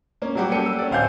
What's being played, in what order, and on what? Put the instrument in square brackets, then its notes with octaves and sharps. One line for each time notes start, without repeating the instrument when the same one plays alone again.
[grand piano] A#3 C#4
F#3 G3 A#3 F#4 G4
G3 C#4 A4 G5 C#7 D#7
A#3 E6
C#4 D5
D1 C5 F5 F#5 G#5 G6